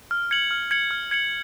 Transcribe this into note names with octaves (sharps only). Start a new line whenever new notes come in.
F6
G#6 C#7 F#7
F6
G#6 C#7 F#7
F6
G#6 C#7 F#7